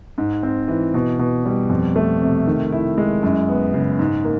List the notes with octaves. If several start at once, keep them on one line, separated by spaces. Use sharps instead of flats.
G#2
C4
E3
B2
B2
G3
F2
A3
C3
D#3
E4
G#3
F#2
B3
C#3
G#2
A#3